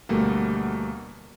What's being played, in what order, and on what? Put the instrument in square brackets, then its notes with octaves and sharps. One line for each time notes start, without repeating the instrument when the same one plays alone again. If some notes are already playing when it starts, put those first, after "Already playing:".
[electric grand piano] D2 B2 G3 A3 A#3